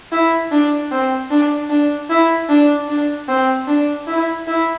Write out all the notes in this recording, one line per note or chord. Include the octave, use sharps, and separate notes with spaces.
E4
D4
C4
D4
D4
E4
D4
D4
C4
D4
E4
E4